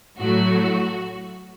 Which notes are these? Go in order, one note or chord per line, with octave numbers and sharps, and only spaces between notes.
A2 F#3 A3 F#4